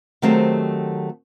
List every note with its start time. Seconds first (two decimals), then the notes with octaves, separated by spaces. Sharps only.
0.22 D#3 F#3 A3 C4 G4 C5